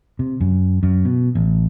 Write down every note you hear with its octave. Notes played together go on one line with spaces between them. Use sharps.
C3
F#2
F#2
B2
A1